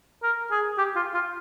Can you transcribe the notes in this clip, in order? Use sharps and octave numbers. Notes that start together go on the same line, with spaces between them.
A#4
G#4
G4
F4
F4